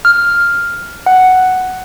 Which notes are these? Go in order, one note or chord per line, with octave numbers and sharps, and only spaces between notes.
F6
F#5